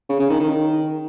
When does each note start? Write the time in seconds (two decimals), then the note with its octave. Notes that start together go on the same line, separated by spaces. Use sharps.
0.09 C#3
0.19 C#3
0.30 D#3
0.40 D#3